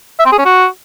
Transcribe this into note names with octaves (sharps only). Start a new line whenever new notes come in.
E5
C4
G#4
C#4
F#4